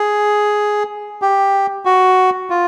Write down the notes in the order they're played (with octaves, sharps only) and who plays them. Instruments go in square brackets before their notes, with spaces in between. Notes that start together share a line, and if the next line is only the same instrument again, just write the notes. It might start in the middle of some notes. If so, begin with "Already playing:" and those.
Already playing: [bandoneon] G#4
G4
F#4
F4